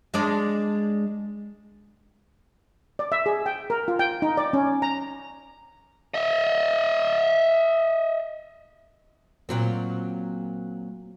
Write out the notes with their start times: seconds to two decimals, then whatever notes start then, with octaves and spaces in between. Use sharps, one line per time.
0.14 G#3 D4 D5
2.99 D5
3.12 E5
3.26 G#4
3.46 G5
3.70 A#4
3.88 F4
3.99 G5
4.22 D#4
4.37 D5
4.53 C#4
4.82 A#5
6.14 D#5 E5
9.49 A#2 F#3 C4